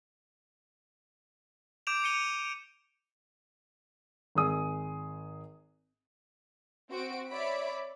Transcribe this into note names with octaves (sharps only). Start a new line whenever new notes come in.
D6 G6 D7 E7 F7
C#7 D#7 G7
G#1 G#4 D#6
C4 F#4 D7
C#5 D5 E5 B5 B6 D7